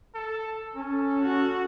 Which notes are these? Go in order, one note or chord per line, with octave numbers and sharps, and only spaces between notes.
A4
C#4 A4
F#4